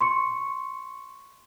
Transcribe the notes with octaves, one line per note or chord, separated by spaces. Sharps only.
C6 C#6 C#7